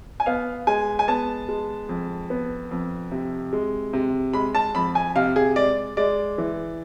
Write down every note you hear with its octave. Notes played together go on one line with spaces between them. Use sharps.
G#5
B3 F5
G#3 G#5
G#5
B3 A5
G#3
F2
B3
F2
C3
G#3
C3
G#3 B5
A5
F2 B5
G#5
C3 F5
G#4
G#3 D5
G#3 D5
E3